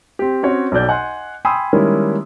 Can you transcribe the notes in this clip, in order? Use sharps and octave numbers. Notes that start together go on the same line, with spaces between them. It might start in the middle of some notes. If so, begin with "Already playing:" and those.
C4 G4
C4 C#4 F#4 C#5
B1 B2 D5 G6
D#5 F#5 G#5 C6
G5 G#5 B5 C6 D#6 E6
D#3 G3 G#3 A#3 C#4 E4